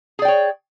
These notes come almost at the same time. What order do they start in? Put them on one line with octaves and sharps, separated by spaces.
G#4 D5 G5 C#5